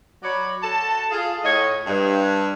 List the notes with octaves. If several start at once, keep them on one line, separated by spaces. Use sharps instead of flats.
F#3 C#5 D5 B5
F#4 A4 A5
F4 G#4
A2 C#5 D#5
G2